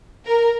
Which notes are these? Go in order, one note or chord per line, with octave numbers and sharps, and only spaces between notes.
A#4